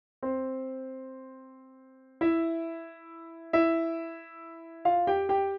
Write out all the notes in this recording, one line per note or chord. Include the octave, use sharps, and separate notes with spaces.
C4 C5
E4 E5
E4 E5
F4 F5
G4 G5
G4 G5